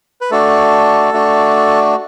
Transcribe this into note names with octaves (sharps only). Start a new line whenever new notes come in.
B4
A3 D4 F#4 A4
A3 D4 F#4